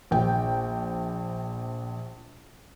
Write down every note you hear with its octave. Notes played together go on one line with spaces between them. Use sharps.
A#1 G5